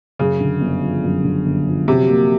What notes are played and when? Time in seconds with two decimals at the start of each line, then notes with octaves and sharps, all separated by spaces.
0.19 F#2 C#3
0.40 D3
0.61 G1
0.82 F3
1.04 F#2
1.24 D3
1.45 G1
1.67 F3
1.88 C3 F#3
2.09 A#3